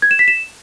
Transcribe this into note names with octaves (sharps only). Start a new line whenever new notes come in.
G#6
E7
B6
E7